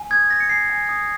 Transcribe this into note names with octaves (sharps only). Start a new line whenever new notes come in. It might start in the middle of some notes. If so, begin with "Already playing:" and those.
Already playing: G#5
D#6 G#6
G6 A#6
C#7
G#5 C7
G#5
D#6